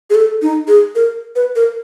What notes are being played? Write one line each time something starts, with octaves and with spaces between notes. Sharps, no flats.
G#4
A4
D#4
G#4
A#4
B4
A#4